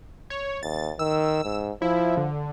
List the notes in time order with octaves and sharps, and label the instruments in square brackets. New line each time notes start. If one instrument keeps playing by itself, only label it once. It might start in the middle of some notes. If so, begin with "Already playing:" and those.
[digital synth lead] C#5
[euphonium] D#2 [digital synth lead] A6
[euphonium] D#3 [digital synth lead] E6
[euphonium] G#2
[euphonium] F3 [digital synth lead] E4
[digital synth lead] D3